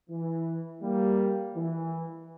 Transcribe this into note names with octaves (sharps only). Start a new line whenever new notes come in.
E3
G3 A#3
E3